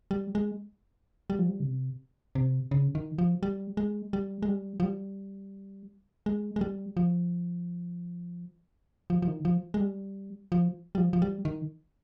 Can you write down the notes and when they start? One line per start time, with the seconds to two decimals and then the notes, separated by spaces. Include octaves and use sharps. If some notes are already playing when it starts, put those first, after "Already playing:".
0.11 G3
0.35 G#3
1.30 G3
1.39 F3
1.49 G3
1.60 C#3
1.65 C3
2.35 C3
2.71 C#3
2.95 D#3
3.18 F3
3.43 G3
3.77 G#3
4.13 G3
4.42 G#3
4.49 G3
4.80 F3
4.83 G3
6.26 G#3
6.56 G#3
6.61 G3
6.97 F3
9.10 F3
9.22 F3
9.28 D#3
9.45 F3
9.74 G#3
9.81 G3
10.52 F3
10.95 G3
10.98 F3
11.13 F3
11.22 G3
11.45 D#3